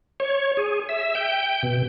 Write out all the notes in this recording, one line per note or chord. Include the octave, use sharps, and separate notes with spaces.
C#5
G#4
E5
G5
B2